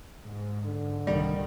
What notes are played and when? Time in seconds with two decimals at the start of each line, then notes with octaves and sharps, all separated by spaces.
0.22 G#2
0.65 D3
1.07 C2 D#3 G3